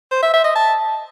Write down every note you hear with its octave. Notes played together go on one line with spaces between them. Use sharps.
C5
E5
E5
D#5
A5